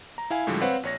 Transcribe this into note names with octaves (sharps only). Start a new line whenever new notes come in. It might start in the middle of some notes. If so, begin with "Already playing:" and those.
A#5
E4 F5 G#5
A2 D3 F3 G3 G#3
C4 B4 C#5 F5 F#5
A#1 C#5 A#6